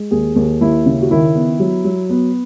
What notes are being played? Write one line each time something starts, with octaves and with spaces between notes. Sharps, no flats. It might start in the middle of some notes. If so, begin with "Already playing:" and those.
Already playing: G#3
D#2 G#4
D#2
D#2 E4
C#3
F#4
D#3 E4
B3
F#3
F#3
B3